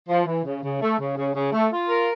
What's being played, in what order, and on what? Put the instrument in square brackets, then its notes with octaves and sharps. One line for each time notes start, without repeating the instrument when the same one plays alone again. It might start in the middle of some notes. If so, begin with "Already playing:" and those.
[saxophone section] F3
E3
C#3
C#3
A3
C#3
C#3
C#3
A3
F4
A#4